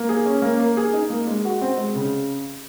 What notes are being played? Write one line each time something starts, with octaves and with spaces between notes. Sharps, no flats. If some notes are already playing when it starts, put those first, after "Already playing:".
Already playing: A#3
G#4
C#4
A#3
A#3
G#4
D#4
A#3
G#3
F#4
C4
G#3
C#3